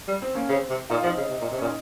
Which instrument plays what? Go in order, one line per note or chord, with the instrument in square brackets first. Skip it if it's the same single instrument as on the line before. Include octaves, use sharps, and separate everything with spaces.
[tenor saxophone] G3
[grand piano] C4
A#3 C#4
[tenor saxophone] C#3 [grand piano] C4
[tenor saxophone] C3
[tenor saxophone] A#2 [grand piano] D#4
[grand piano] F4
[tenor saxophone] F3 [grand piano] C4 D#4
[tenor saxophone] C#3
C3
A#2
C3
[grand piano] C#4
[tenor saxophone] A#2
[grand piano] D#4